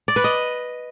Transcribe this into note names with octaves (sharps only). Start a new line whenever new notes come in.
D5
B4
D#5